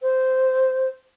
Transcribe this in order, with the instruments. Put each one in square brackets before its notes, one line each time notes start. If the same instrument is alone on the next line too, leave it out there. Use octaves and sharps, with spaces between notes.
[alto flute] C5